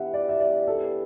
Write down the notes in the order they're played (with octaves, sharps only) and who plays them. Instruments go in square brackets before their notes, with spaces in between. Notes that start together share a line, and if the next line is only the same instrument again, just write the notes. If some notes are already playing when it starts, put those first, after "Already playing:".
Already playing: [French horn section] E3 B3 D4 G4 [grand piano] E5 F#5
[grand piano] D5
E5
D5
A4